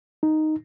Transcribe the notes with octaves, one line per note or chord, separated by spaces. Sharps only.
D#4